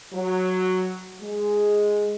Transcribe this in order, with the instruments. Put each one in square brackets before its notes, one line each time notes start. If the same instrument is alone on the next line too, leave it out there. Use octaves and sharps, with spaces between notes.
[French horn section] F#3
G#3